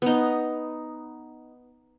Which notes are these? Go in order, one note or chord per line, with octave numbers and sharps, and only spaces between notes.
B3 D#4